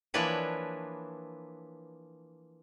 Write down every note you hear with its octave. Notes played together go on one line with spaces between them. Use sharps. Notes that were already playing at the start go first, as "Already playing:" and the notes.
E3 F3 A#3 D4 B4 C#5